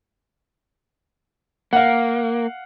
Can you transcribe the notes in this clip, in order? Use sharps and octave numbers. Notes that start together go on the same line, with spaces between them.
A#3 F5 F#5